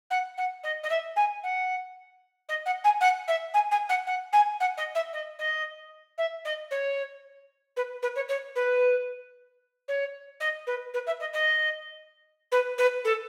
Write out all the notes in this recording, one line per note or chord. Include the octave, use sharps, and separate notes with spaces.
F#5
F#5
D#5
D#5
E5
G#5
F#5
D#5
F#5
G#5
F#5
E5
G#5
G#5
F#5
F#5
G#5
F#5
D#5
E5
D#5
D#5
E5
D#5
C#5
B4
B4
C#5
C#5
B4
C#5
D#5
B4
B4
E5
D#5
D#5
B4
B4
A4